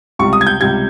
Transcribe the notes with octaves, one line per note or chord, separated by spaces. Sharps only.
C#2 C3 G3 C#6
D#6
G#6
G6
C#2 C3 G3 G#6